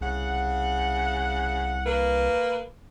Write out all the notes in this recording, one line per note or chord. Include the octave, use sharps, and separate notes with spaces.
C2 C#3 F#5
A#3 B4